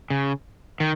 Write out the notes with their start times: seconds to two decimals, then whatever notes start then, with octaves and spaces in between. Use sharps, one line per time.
0.10 C#3
0.80 D#3